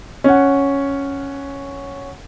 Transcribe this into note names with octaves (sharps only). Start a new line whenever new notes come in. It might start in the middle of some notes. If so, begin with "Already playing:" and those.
C#4 F#5